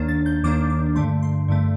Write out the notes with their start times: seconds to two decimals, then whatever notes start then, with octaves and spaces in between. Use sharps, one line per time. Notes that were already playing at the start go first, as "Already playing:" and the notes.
Already playing: D#2 D#3 A#3 D4
0.08 A6
0.26 G6
0.44 D#2 D#3 A#3 D4 D6
0.70 D6
0.96 G2 D3 A3 C6
1.23 C6
1.48 G2 D3 A3